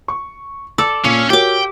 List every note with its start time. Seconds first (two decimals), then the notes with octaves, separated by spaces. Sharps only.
0.08 C#6
0.78 A4 D5 E6
1.04 A#2 C#4 F5
1.30 F#4 G4 A#4 C#5 G5 D6